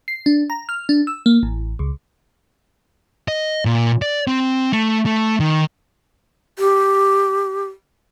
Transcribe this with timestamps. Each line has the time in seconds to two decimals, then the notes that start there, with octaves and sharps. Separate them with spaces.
0.08 C7
0.26 D4
0.50 A#5
0.69 F6
0.89 D4
1.07 E6
1.26 A#3
1.43 A1
1.79 C#2
3.28 D#5
3.65 A#2
4.02 D5
4.27 C4
4.73 A3
5.06 A3
5.40 D#3
6.59 G4